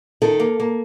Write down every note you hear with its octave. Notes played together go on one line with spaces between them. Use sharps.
D#3 A4
A#3
A#3